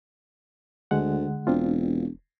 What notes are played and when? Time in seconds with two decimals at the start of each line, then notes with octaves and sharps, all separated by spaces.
0.91 D2 D3 G#3 F#5
1.47 E1 C4 D4 F4